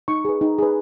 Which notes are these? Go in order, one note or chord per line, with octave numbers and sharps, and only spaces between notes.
D#4 C#6
G#4 B4
D#4
G#4 B4